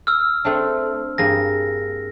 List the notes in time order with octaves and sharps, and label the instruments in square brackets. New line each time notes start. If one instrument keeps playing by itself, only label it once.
[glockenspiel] E6 F6
[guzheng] A3 C4 D4
[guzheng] G2 A#3 G#4 [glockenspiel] A#6